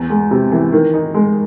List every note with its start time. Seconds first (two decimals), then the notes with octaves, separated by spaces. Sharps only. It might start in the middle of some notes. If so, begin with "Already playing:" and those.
Already playing: E2
0.10 G#3
0.31 C3
0.52 E3
0.72 D#3
0.94 D#4
1.14 G#3